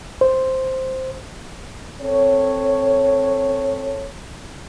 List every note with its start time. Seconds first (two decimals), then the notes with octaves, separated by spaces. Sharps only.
0.21 C5
2.01 C4 A4 C#5